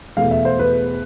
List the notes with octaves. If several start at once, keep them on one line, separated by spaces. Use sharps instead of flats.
E2 B2 A3 F5
E5
C5
B4